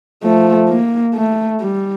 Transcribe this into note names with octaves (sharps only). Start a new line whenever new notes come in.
F3 A3
A#3
A3
G3